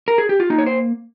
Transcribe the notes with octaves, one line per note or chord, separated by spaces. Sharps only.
A#4
G#4
G4
F4
A#3 D#4
C#5
C5